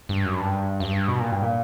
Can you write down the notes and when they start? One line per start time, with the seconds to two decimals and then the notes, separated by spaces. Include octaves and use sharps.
0.09 G2
0.25 F#2
0.40 G2
0.80 F#2
0.85 G2
1.08 B2
1.20 A#2
1.32 G2
1.42 A#2